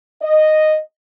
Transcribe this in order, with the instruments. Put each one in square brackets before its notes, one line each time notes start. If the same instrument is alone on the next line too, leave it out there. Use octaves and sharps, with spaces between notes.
[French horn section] D#5